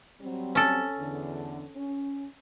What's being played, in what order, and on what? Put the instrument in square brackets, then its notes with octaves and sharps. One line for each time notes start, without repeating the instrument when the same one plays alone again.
[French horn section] F#3 G3 C4
[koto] C#4 A4
[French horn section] E2 D3
C#4